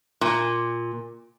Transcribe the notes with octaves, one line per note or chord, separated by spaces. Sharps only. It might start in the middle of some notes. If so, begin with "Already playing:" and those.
A#2